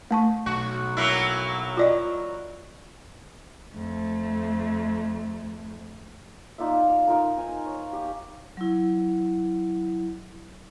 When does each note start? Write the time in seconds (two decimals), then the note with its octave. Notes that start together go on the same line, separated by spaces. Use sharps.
0.11 A3 A5 C#6
0.46 B1 F#4
0.97 F#3 A#3 E4
1.77 F4 D5 D#5
3.75 F2 A3
6.58 D#4 F4 D5 E5
6.87 F5
7.07 D#4 F4 A#4
7.37 G5 G#5
7.66 C#5
7.93 G4
8.57 F#3 E4